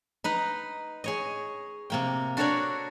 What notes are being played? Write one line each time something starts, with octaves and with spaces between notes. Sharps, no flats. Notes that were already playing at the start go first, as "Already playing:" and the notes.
D#4 B4 A#5
G#4 C#5 D#5
C3 A#3 G5
D4 F#4 A4 A#4 C#5 D5